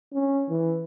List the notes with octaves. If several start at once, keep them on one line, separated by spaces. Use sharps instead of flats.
C#4
E3